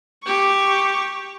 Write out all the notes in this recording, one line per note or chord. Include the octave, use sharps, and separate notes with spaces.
G4 C#6